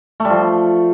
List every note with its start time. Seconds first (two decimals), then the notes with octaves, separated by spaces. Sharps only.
0.20 A3
0.25 G3
0.30 F3